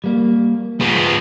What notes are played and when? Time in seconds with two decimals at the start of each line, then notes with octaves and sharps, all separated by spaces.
0.04 G3 A#3
0.81 F3 B3 G#4